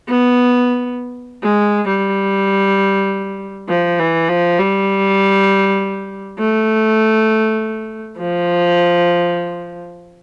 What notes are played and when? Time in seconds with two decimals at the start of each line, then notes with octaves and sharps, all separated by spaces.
0.09 B3
1.43 G#3
1.88 G3
3.69 F3
3.99 E3
4.29 F3
4.59 G3
6.39 A3
8.18 F3